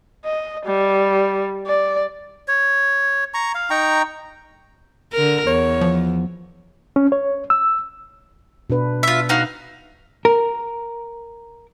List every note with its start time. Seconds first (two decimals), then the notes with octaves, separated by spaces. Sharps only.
0.25 D#5
0.65 G3
1.67 D5
2.48 C#5
3.34 A#5 C#6
3.55 F5
3.70 D#4 G5 A#5 C#6
5.12 D3 A#4
5.47 E2 C#5
5.81 F3
6.96 C#4
7.12 C#5
7.50 E6
8.70 B2 D4 B4
9.03 F4 E5
9.29 D#4 F#4 F5
10.25 A#4